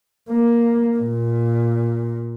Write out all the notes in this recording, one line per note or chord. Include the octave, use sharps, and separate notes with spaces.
A#3
A#2